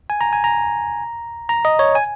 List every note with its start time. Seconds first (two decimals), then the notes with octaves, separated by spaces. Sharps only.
0.10 G#5
0.21 A#5
0.33 G#5
0.44 A#5
1.49 A#5
1.65 D#5
1.79 C#5
1.95 G#5